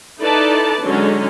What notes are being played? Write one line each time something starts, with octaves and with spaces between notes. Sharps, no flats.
D#4 E4 A4 B4 D5 A5
D3 F#3 G#3 C#4 D#4